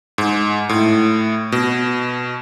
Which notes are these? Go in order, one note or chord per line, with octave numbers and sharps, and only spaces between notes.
G#2
A2
B2